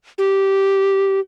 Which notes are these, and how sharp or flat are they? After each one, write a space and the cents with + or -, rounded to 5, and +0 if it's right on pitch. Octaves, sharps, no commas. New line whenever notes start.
G4 -10